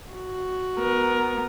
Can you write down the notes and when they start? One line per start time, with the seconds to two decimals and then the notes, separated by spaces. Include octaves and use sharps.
0.13 F#4
0.78 B3 A#4